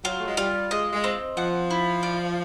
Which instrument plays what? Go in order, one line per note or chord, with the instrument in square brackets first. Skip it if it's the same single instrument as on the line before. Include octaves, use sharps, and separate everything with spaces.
[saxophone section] F#3 [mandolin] F4
[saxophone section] A3
G#3
[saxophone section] G3 [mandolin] F4
[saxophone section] G#3 [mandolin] D#5
[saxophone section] G#3
[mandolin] C4
[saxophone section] F3 [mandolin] F#5
[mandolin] E4
D5